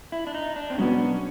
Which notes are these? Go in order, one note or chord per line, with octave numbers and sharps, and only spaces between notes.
E4
D4
D#4
D4
C4
B2 F#3 B3 C#4 D4